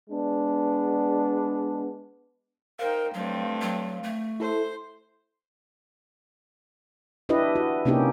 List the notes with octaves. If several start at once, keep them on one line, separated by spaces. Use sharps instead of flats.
G#3 B3 D4
D#4 A#4 C5 F5 G5
G2 F#3 A3 C4
F#3
A3
E4 A4 C5
D4 E4 G4 B4 D#5
F#4
C3 A#3 C#4 D#4 G4